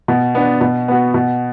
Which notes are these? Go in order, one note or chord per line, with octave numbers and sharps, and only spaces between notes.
B2
B3 D4
B2
B3 F#4
B2